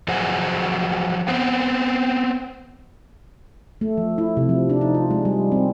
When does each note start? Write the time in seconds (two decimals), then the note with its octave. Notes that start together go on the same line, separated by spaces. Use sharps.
0.08 F3 F#3 G#4 C5 F#5
1.28 B3 C4
3.81 A3
3.97 F3
4.18 E4
4.37 C3
4.49 F3
4.69 D4
4.81 D#4
4.95 F4
5.11 G#3
5.25 G3
5.52 C4